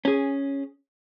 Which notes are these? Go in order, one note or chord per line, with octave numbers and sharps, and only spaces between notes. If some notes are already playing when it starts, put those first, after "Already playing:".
C#4 G#4